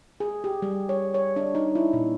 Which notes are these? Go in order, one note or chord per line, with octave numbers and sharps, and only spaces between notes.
G#4
G4
G3
C#5
C#5
D4
D#4
E4
A#2